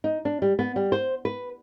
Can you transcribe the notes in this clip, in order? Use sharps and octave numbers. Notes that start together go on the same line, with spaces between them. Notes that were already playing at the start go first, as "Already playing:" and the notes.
D#4
D4
G3
B3
G3
C5
B4